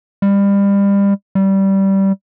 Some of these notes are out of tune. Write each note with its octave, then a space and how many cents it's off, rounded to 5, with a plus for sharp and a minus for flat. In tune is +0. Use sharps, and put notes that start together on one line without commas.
G3 +30
G3 -15